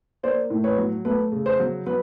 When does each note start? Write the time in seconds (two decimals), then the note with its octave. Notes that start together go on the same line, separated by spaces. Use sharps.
0.23 A#3 C5 D5
0.50 A2
0.64 B4 C#5
0.77 F#3
1.05 A3 B4
1.32 C#3
1.46 C5
1.59 F#3
1.87 F#3 B4